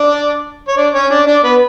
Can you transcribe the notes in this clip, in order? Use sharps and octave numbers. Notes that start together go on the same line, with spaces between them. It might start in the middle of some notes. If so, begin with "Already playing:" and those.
Already playing: D4 D5
C#5
D4 D5
C#4 C#5
D4 D5
D4 D5
B3 B4